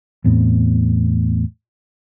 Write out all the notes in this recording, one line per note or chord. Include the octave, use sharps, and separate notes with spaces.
E2 A2 B3 C4